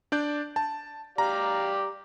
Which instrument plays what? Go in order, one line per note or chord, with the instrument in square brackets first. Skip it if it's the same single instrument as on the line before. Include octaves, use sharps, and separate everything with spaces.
[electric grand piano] D4 D5 G6
A5
[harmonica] G4 D5 F5 [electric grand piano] A#5